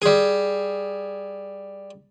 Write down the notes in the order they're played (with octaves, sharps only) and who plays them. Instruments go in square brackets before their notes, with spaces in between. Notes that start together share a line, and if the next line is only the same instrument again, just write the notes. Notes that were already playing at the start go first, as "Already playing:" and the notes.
[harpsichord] G3 G#4